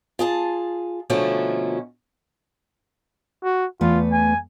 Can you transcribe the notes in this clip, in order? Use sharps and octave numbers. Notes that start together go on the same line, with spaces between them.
F4 G#4 A5
B2 D3 F3 A3 A#3 C#4
F#4
E2 A3 F4 B4
G#5